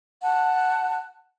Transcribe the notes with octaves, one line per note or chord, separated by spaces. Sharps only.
F#5 A5